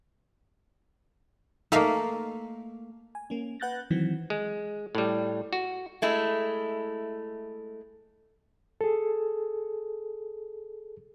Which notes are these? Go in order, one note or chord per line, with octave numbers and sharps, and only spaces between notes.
A3 A#3 D#4 E5 F5
G#5
A#3 C#4
B4 F#5 F#6 G6 A6 A#6
D#3 E3 F#3 C4
G#3
A2 G3
F#4
G#3 A3 E4
G#4 A4